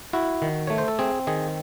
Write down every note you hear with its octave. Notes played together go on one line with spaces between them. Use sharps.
E4 F#4
D#3
A3 C#5
C5
A4
C4 G#4
D#3 G#4